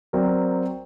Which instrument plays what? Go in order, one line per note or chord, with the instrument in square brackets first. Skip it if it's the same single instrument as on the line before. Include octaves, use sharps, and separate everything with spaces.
[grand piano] F#3 C4 F#4 A#4 D5